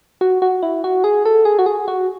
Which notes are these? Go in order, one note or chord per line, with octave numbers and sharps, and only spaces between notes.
F#4
F#4
E4
F#4
G#4
A4
G#4
F#4
G#4
F#4